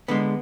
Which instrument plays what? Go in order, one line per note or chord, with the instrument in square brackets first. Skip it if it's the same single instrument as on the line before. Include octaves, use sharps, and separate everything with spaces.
[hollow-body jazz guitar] D3 G#3 B3